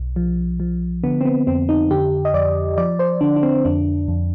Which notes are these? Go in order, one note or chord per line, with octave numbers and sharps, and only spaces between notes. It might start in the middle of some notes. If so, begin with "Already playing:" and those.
Already playing: B1
F3
F3
D3 B3
C4
B3
F2 C4
D#4
D3 G4
D#5
F2 D5
F3 D5
C5
D3 D4
D4
C4
F2 D4
F2